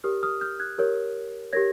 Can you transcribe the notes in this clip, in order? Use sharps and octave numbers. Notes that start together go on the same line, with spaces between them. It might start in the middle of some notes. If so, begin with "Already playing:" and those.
G4 A#4 C#5 D#6 F6
D#6 F6
F6 G6
F#6 G#6
G4 A#4 C#5
G4 A#4 C#5 G#6 A#6